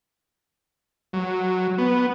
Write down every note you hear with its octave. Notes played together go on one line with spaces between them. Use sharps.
F#3
B3